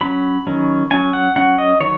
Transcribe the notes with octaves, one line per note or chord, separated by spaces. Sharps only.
F#3 C#4 B5
D#3 F#3 C#4
F#3 C#4 G#5
F#5
F#3 C#4 F#5
D#5
D#3 F#3 C#5